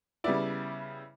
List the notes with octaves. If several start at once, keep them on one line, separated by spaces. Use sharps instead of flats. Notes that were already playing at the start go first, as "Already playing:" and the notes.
C#3 G3 B3 E4 D5